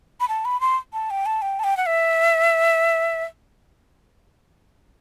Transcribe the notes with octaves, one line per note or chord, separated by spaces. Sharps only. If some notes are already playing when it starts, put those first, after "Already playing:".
B5
A5
B5
C6
A5
G5
A5
G5
A5
G5
F#5
E5